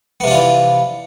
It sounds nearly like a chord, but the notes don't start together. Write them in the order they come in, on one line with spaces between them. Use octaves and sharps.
B3 C3 D4 F4 E3